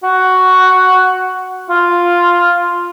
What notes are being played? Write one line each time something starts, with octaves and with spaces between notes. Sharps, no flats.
F#4
F4